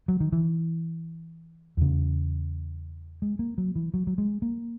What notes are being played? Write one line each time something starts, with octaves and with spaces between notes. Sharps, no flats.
F#3
D#3
E3
E2 C#3
G#3
A#3
F#3
E3
F#3
F#3
G#3
A#3